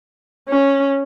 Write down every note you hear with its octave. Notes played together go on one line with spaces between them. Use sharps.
C#4